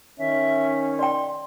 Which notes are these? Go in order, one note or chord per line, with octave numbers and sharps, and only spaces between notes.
D#3 C#4 E5
D5 G5 C6